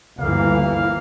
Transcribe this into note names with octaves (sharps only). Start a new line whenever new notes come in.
G1 D2 E3 A#3 F5